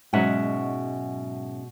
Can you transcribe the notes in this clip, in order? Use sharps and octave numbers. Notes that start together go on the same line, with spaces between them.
G#2 B2 F#3 G#3 C#4 E5 F#5